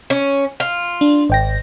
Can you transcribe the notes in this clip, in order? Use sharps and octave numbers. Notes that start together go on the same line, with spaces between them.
C#4
F4
D4
G#1 G5 A#6